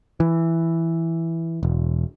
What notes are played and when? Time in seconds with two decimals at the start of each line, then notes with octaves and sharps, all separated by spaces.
0.20 E3
1.63 E1